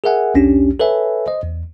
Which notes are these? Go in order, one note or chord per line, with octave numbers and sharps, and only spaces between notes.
G#4 A#4 E5 F#5 G#5
B1 E2 C#4 D4 G4
A4 B4 C#5 E5 G#5
C5 D#5
E2